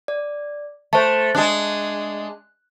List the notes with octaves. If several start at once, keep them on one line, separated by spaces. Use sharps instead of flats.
D5
A3 C5 A5
G#3 D4 F#6